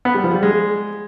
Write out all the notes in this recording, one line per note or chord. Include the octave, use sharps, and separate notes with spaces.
B3
G3
F3
G3
G#3